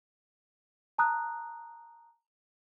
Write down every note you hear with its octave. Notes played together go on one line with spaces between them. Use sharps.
A5 A#5 D#6 F#6